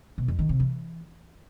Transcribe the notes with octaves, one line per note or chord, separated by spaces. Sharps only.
B2
F2
D#3
C3
E3